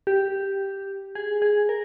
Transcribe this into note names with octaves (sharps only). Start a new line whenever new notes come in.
G4
G#4
G#4
A#4